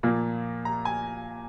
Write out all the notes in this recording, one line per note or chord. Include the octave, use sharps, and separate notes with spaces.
A#2 F3 A#3
A#5
G#5